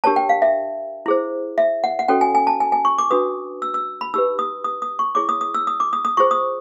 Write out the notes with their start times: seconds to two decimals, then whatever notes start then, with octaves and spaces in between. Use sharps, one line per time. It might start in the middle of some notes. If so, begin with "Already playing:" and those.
0.04 D4 G4 A#4 C#5 A5
0.16 G5
0.29 F5
0.42 E5
1.06 E4 G#4 C5
1.58 E5
1.84 F#5
1.99 F#5
2.08 C#4 F#4 A4 C#5 G5
2.21 G#5
2.35 G#5
2.47 A5
2.60 G#5
2.72 G#5
2.85 C#6
2.98 D6
3.10 D4 F#4 B4 D#6
3.62 E6
3.74 E6
4.01 B5
4.14 D#4 G4 B4 E6
4.39 D#6
4.64 D#6
4.82 D#6
4.99 C#6
5.15 E4 G#4 C#5 D6
5.29 D#6
5.41 D#6
5.54 E6
5.67 D#6
5.80 D6
5.93 D#6
6.05 D#6
6.17 F4 G#4 C5 C#6
6.31 D#6